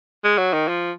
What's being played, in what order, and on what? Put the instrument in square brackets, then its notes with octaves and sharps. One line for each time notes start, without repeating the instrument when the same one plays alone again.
[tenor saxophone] G#3
F#3
D#3
F3